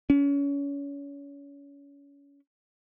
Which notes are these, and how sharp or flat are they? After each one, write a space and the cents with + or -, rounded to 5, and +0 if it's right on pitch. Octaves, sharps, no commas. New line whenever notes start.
C#4 +30